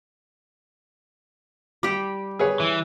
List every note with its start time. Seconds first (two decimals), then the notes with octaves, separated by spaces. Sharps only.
1.83 G3 G4 D6
2.39 G#4 B4 C#5
2.60 E3